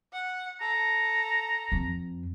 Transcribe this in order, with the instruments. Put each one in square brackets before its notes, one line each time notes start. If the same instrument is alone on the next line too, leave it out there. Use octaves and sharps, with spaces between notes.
[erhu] F#5
[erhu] A4 [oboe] A#5
[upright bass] F2